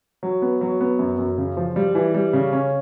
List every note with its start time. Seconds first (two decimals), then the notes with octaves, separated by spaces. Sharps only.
0.23 F#3
0.42 B3
0.61 F#3
0.81 B3
0.99 F#2
1.18 F#2
1.38 C#3
1.57 F3
1.76 G3
1.95 E3
2.14 G3
2.33 C#3
2.53 C#4